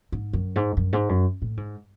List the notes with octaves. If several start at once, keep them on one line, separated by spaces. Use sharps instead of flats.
G#2
F#2
G#2
F#2
G#2
F#2
A2
G#2